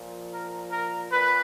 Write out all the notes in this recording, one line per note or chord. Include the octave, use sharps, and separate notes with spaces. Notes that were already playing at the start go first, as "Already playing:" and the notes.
Already playing: A#2 F3
A#4
A#4
A#2 B4